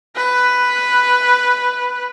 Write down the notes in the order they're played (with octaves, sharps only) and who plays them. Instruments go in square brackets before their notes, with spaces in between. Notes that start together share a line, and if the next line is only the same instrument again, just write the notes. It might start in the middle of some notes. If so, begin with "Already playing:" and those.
[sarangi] B4